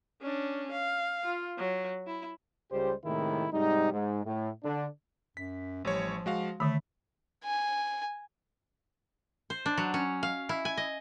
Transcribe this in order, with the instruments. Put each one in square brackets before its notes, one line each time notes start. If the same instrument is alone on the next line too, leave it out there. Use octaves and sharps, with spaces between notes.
[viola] C#4 D4
F5
F4
F#3
E4
[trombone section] C#2 G3 G#3 G4 C5
A2 C3 D#3 G#3 A#3 E4
G#2 C3 G3 D#4
G#2
A2
D3 D4
[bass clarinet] F#2 [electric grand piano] B6
[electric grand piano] A1 G3 C#5 [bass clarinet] F3
[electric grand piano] G#3 F#4 F5
[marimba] D3 D#3 [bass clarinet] A3 [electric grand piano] B5
[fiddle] G#5
[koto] C5
D4
F#3
C#4
F5
E4
G#5
D#5